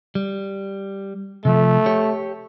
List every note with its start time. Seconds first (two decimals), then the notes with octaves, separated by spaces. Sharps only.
0.15 G3
1.45 C3 F3 A3
1.86 G4 C#5